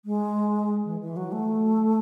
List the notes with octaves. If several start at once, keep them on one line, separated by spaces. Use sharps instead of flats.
G#3
E3
E3
F#3
A3